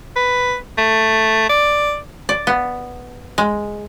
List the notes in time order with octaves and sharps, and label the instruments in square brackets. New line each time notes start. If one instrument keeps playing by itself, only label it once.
[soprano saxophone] B4
A3
D5
[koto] D5
B3
G#3